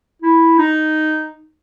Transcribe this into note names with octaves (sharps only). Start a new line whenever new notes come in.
E4
D#4